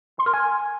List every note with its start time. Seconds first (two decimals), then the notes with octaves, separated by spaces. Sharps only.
0.19 C6
0.26 A#4
0.34 G#5